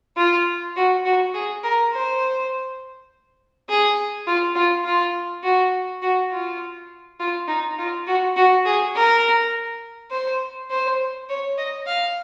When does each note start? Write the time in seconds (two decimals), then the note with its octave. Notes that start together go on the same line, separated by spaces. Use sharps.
0.17 F4
0.76 F#4
1.05 F#4
1.34 G#4
1.63 A#4
1.93 C5
3.69 G#4
4.27 F4
4.55 F4
4.85 F4
5.44 F#4
6.02 F#4
6.32 F4
7.20 F4
7.48 D#4
7.78 F4
8.07 F#4
8.36 F#4
8.66 G#4
8.95 A#4
10.12 C5
10.70 C5
11.29 C#5
11.58 D#5
11.87 F5